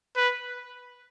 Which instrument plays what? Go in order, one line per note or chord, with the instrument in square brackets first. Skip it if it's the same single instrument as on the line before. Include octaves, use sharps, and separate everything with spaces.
[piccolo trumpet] B4